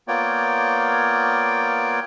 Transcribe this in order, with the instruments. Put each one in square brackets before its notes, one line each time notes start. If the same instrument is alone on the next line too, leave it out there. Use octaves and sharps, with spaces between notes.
[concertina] A#3 B3 F4 C#5 D5 G5